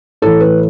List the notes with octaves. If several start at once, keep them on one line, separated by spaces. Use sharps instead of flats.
A2 E3 A4
B4